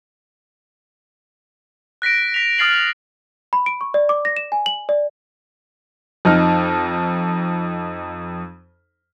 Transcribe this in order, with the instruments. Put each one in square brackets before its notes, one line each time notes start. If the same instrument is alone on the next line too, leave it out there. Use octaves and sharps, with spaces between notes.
[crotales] F#6 A#6 B6 D7
B6 F7
D#6 F6 A6 C7 F#7
[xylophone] B5
D7
C#6
D5
D6
A#6
E7
G#5
F#7
D5
[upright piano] F2 D#4 F6